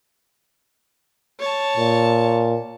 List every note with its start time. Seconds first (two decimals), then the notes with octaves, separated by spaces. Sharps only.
1.40 C#5 A5
1.77 A#2